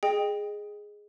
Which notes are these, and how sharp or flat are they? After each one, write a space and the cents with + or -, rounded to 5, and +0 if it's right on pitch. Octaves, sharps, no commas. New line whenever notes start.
G#4 +0 D#5 -15 G5 +10